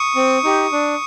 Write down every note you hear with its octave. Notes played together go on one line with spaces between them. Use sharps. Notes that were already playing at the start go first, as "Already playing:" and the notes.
Already playing: C#6 D#6
C4
D#4 G4
D4